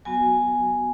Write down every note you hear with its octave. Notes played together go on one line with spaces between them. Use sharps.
F#3 B3 F#4 G#5